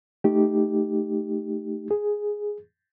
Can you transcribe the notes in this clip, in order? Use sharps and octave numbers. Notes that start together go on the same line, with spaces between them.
A3 D#4 G4
G#4